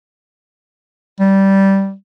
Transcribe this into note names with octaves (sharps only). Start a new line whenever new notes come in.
G3